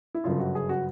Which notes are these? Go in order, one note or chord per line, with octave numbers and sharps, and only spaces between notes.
E4
G1 F#2 C#3 F4
F#4
G#4
F#4